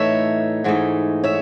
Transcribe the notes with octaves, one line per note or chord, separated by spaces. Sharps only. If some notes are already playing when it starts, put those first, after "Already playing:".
Already playing: A2 E3 A3 D#4 C#5 E5
G#2 E3 A3 D#4
C#5 E5